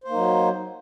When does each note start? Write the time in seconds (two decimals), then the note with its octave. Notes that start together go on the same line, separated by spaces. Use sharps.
0.04 C5
0.08 A#3
0.11 D#4
0.15 F#3